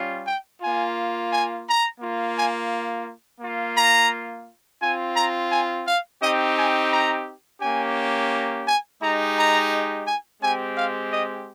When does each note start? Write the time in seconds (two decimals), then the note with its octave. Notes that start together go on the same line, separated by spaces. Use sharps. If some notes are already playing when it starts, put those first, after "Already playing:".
Already playing: G3 C#4 F4
0.26 G5
0.61 A#3 F4 G#5
1.31 G#5
1.66 A#5
2.01 A#3 F4
2.36 G#5
3.41 A#3 F4
3.76 A#5
4.81 C4 F4 G#5
5.16 A#5
5.51 G#5
5.86 F5
6.21 C4 D#4 G4 D#5
6.56 G#5
6.90 A#5
7.61 A#3 C#4 G4 G#5
8.31 A#5
8.66 G#5
9.01 G#3 D#4 G4 A#5
9.36 A#5
10.06 G#5
10.41 G#3 C4 G4 G#5
10.76 F5
11.11 D#5